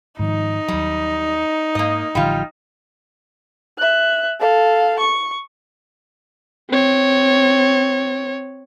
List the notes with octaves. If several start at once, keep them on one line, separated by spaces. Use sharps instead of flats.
G#2 D#3 F3 D#4
D#2 F#3 G3
G#2 A#3 D#5
A1 D3 F3 G3 F4
E5 F#6
A4 F5
C#6
C4 C#5